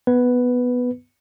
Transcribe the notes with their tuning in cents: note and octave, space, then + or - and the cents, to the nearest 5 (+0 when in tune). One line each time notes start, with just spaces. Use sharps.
B3 +0 B4 +0